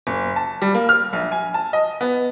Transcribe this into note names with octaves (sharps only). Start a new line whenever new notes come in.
F#1
A5
G3
A#3
F6
A#1
G#5
A5
D#5
B3